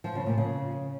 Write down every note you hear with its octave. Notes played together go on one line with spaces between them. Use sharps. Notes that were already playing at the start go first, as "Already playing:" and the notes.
F3
C#3
A#2
C#3